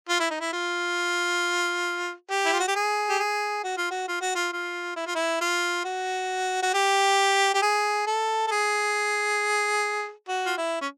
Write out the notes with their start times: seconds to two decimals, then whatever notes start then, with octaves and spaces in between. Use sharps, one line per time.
0.09 F4
0.19 E4
0.30 D#4
0.40 E4
0.53 F4
2.31 G4
2.45 E4
2.53 F4
2.60 F#4
2.68 G4
2.75 G#4
3.09 G4
3.19 G#4
3.64 F#4
3.77 F4
3.91 F#4
4.08 F4
4.21 F#4
4.35 F4
4.52 F4
4.96 E4
5.06 F4
5.15 E4
5.41 F4
5.85 F#4
6.62 F#4
6.74 G4
7.54 G4
7.62 G#4
8.07 A4
8.47 A4
8.51 G#4
10.28 F#4
10.46 F4
10.58 E4
10.82 C#4